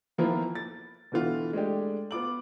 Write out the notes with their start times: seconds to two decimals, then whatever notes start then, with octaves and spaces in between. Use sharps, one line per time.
0.18 D#3 F3 A#3 B3 E4 F4
0.55 A6
1.12 B2 D3 E3 F4 F#4
1.53 G#3 A3 D4 G4
2.11 B3 F4 D6 F#7